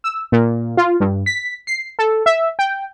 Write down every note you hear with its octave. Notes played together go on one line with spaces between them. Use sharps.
E6
A#2
F4
G2
B6
C7
A4
E5
G5